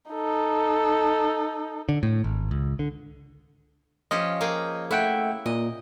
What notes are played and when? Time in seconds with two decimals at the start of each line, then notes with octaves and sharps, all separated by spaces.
0.11 D#4 A4
1.89 D3
2.03 A2
2.24 G#1
2.51 C#2
2.79 D3
4.11 F3 C#4 G4 D#5
4.41 A#3 G#4 G5
4.91 A3 E4 E5 F#5 G5
5.46 A#2 D#5